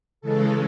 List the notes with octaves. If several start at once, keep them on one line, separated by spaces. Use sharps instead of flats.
C#3 E3 G#3 A4